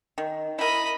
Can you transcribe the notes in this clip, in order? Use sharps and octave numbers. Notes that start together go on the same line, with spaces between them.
D#3
E4 A#4 D#5 B5